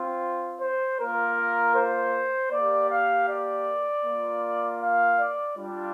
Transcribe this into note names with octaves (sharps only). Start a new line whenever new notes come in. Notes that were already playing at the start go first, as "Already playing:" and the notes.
Already playing: C4 F4
C5
A#3 F4 A#4
C5
A#3 G4 D5
F5
D5
A#3 F4
F5
D5
G3 D4 F4